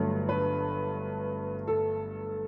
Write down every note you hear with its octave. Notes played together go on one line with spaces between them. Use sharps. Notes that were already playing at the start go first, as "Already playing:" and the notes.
Already playing: G1 G2 F#3 A3
B4
A4